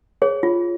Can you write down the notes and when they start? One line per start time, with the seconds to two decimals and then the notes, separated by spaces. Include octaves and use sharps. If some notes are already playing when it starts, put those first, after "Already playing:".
0.22 G#4 C#5
0.43 F4